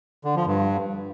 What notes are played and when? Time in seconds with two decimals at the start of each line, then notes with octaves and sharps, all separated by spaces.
0.24 D3
0.36 F3
0.47 G2